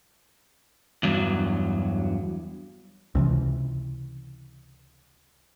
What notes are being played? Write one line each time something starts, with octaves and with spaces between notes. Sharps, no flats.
E2 G2 F#3
C#2 C3 E3